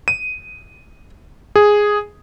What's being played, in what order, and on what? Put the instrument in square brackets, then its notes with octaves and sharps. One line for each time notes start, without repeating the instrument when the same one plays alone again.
[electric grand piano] D#7
G#4